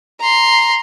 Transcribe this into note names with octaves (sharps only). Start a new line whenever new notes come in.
A#5 C6